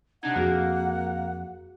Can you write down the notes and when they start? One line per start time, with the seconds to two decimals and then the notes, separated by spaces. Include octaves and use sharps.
0.23 C3 D4 D#4 F#5 G#6
0.36 F2 A#3 F#4 G#4